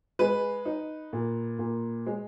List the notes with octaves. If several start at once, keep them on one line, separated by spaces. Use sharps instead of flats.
G#3 B4
D#4
A#2
A#2
G#3